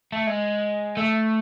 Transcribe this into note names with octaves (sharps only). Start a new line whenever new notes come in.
A3
G#3
A3